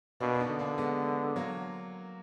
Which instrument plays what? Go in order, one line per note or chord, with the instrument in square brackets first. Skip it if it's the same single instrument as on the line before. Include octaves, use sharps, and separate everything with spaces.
[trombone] B2 [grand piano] A#3 D4
[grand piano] D4
B3 D#4
[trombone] D3
[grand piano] A#3 D4
G#3 B3
F#3 A#3